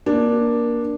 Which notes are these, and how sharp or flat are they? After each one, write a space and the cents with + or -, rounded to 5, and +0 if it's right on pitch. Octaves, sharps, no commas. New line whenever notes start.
A#3 +20 D4 +0